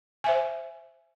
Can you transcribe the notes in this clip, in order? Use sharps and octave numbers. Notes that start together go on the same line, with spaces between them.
C5 E5 G#5